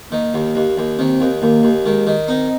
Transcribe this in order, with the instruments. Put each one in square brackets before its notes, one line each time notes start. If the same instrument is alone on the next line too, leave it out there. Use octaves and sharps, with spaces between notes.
[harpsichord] D#3 [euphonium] A#3
[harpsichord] D#2
D#2
D#2
[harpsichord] D#3 [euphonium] C4
[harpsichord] D#2
[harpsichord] D#2 [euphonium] A#3
[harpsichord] D#2
[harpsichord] D#3 [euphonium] G#3
[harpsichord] D#3
[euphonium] C4 [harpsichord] D#4